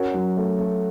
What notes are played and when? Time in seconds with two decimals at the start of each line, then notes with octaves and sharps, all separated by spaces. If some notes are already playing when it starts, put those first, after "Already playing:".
Already playing: C#4 F#4 A#4
0.14 F#3
0.37 A3
0.59 A3